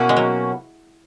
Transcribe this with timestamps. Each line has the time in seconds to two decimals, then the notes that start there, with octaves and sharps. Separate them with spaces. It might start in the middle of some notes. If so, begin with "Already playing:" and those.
Already playing: B2 A#3 C#4 E4 F#4
0.09 G#3
0.17 F#3